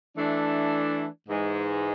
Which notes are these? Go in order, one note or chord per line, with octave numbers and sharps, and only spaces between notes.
E3 A3 D4
G#2 E3 G#3